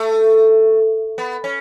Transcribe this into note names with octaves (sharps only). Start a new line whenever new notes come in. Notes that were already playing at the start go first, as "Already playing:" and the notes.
Already playing: A3
B3
C#4